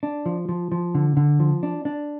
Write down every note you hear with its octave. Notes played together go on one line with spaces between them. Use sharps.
D4
F3
F3
F3
D3
D3
F3
D4
D4